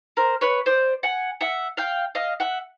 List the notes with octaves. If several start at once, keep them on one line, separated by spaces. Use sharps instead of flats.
A#4 C5
B4 C#5
C5 D5
F#5 G#5
E5 F#5
F5 G5
D#5 F5
E5 F#5